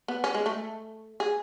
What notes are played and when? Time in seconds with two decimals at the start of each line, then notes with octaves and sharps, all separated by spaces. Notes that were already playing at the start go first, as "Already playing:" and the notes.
0.08 B3
0.24 C#4
0.34 G#3
0.46 A3
1.20 G#4